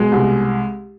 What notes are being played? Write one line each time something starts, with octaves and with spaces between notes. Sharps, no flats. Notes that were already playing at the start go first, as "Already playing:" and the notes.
Already playing: B2 G#3
C2